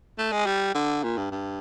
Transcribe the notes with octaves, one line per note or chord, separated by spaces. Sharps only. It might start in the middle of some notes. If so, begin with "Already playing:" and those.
A3
G#3
G3
D3
A#2
G2
G2